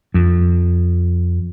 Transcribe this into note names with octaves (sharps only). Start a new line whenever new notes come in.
F2